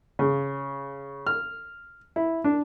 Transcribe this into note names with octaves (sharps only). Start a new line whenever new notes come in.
C#3
F6
E4
D4